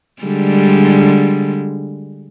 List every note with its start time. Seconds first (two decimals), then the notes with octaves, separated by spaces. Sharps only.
0.22 D3 G3 G#3